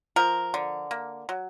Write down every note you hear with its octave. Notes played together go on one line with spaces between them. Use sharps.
F3 A#4
D3
A#3
F#3